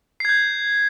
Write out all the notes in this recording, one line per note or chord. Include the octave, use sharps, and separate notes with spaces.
G6 G#6 C7